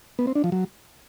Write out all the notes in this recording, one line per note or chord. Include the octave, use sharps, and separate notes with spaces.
B3
C4
D4
F3
F#3